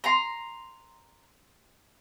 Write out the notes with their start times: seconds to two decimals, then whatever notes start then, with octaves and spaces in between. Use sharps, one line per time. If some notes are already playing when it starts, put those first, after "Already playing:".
0.04 A#5 C6